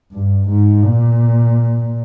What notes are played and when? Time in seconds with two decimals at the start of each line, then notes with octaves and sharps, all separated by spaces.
0.12 G2
0.48 G#2
0.84 A#2